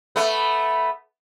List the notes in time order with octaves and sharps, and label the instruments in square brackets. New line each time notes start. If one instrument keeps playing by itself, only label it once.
[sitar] A3 B3